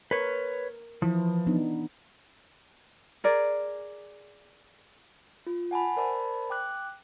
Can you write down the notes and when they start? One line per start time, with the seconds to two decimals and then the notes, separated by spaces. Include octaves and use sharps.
0.11 A#4 B4 C#5
1.02 E3 F3 E4
1.47 B3 D4 D#4
3.24 G#4 A#4 D5
5.47 F4
5.71 F#5 G#5 A5 B5
5.97 A#4 C5 D5 A5 B5
6.50 G5 D6 F#6